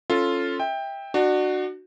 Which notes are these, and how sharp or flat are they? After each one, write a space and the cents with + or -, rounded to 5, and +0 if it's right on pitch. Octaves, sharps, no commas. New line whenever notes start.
C#4 -10 F4 +0 A4 +0
E5 -20 G5 +15
D4 +35 F#4 +0